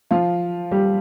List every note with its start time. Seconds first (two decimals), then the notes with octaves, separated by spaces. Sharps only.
0.11 F3 F4
0.71 G3 G4